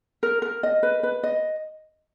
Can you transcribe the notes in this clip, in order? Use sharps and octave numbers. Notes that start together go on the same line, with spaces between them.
A#4
A#4
D#5
B4
B4
D#5